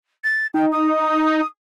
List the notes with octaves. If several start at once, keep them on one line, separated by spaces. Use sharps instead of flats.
A6
D#4 G5
D#6